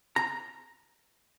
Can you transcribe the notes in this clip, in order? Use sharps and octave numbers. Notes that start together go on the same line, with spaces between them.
A#5